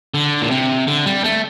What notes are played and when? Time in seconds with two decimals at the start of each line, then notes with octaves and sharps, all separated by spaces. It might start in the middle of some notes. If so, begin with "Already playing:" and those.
0.14 D3
0.41 A#2
0.50 C3
0.88 D3
1.06 G3
1.24 A3